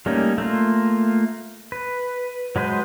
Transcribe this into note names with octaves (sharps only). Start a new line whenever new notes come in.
G3 A3 A#3 C#4 D#4
A3 A#3 F4
B4
F#3 G#3 B4 C5